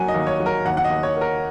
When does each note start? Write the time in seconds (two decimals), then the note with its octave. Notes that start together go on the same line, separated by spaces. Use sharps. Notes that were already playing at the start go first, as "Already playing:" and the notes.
Already playing: F#3 A#3 G#5
0.08 D#5
0.14 D#2
0.27 C#5
0.40 F#3
0.46 A#4
0.65 D#2 F#5
0.77 F#5
0.84 D#5
0.90 D#2
1.03 C#5
1.16 A#3
1.21 A#4